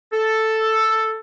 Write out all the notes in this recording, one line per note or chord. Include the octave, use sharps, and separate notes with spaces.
A4